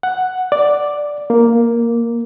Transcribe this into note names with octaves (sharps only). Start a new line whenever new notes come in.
F#5
D5
A#3